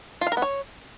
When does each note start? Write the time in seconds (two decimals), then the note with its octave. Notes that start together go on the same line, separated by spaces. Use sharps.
0.21 F4
0.27 F5
0.32 A#4
0.37 B3
0.42 C#5